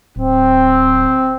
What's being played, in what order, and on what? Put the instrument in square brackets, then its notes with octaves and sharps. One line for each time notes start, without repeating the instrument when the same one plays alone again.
[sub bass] D1 [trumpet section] C4